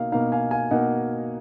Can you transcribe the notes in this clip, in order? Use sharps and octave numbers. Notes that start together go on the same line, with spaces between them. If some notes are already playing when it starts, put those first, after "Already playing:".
Already playing: B2 A#3 D#4 F5
B2 A#3 D#4 F5
F5 G#5
F5 G#5
B2 A#3 D#4 D#5 F#5